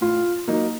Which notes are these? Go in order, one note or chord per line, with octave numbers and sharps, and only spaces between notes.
A2 F4
F#3 A#3 D#4